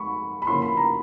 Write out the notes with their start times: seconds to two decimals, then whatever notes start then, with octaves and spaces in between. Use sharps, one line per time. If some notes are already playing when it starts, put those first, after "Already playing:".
Already playing: G#3 B5 C#6
0.42 B5
0.46 C#3 F3 A#3 C#4 E4 C6
0.62 B5
0.77 A#5